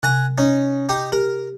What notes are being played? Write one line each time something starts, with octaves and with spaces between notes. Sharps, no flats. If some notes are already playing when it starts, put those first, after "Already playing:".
C3 F#5 G#5 A#5
C#4 D#4
D#4 G4
G4 A#4